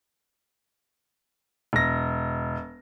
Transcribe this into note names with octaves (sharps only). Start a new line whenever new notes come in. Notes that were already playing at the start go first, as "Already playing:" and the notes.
E1 A#6